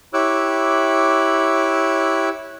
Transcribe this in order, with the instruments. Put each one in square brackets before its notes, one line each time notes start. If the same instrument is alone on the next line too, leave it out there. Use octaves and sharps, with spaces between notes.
[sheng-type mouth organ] E4 G4 C#5 D6 E6 F#6